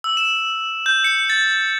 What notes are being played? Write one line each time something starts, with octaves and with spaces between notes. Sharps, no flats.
E6
E7
G6
C#7
A6